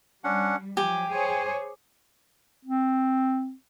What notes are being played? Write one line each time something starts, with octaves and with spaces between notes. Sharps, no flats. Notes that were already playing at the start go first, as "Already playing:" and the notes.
G3 C#4 D4 F#5
F3 F#3 G4 G#5
G#4 C5 C#5 G#5
C4